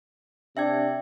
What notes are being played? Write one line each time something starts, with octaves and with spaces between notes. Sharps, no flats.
C3 D4 E5 G5 G#6